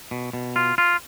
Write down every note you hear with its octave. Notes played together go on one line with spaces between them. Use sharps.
B2
B2
F4
F4